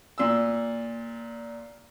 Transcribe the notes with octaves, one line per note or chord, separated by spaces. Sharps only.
A#2 E6